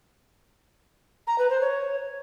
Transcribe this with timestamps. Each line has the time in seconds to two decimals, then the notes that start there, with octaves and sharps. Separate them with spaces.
1.27 A#5
1.38 B4
1.50 C5
1.61 C#5